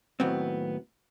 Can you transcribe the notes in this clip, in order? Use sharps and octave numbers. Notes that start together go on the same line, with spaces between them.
D#2 A2 F#3 B3 C4